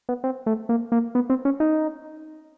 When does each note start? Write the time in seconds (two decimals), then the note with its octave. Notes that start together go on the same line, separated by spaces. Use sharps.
0.09 B3
0.24 C4
0.46 A3
0.69 A#3
0.92 A#3
1.15 B3
1.30 C4
1.45 C#4
1.60 D#4